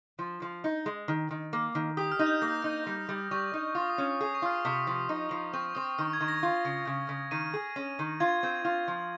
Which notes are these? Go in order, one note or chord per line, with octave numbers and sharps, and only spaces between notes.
F3
F3
D#4
G#3
D#3
D#3
A#3
D#3
G4 D#6
F6
D#4
G6
A#3 A#6
D#4
G3
G3
G3 C#6
D#4
F4 D#6
D#6
C#4
G#4 D#6
C#6
F4 F6
D#6
C3 D#6
F3
D#4
F3
C4 C#6
C4 D#6
D#3 F6
G#6
D#3
A#6
F4
C#3
C#3
C#3
D#3 D#7
G#4
C#4
D#3
F4 G#6
C4
F4
F3